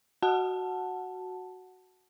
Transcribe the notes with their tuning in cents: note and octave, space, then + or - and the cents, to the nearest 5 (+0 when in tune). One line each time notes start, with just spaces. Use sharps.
F#4 +0 F#5 -5 A5 +0